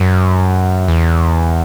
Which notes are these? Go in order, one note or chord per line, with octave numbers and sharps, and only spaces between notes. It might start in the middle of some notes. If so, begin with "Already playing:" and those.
Already playing: F#2
E2